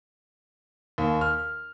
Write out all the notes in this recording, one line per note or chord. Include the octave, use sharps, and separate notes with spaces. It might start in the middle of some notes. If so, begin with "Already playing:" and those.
D#2
F6